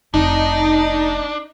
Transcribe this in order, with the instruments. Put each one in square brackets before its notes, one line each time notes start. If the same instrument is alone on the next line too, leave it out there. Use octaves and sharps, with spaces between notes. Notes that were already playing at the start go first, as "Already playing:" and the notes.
[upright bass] F1 [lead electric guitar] D4 [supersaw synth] D#4